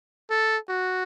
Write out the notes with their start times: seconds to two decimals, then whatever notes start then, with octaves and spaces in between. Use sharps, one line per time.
0.30 A4
0.69 F#4